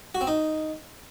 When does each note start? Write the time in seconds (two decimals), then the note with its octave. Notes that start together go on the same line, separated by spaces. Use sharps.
0.15 F#4
0.21 C4
0.27 D#4